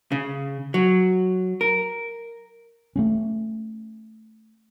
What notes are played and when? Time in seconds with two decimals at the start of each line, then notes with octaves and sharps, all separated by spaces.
0.12 C#3
0.74 F#3
1.61 A#4
2.96 A3 A#3 C#4